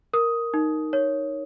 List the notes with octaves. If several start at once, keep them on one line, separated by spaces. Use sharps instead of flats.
A#4 D#6
D#4
C#5